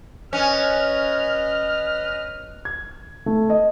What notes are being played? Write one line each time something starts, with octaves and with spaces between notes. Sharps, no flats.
C#4 B4 D#5 F6
G#6
A3
D#5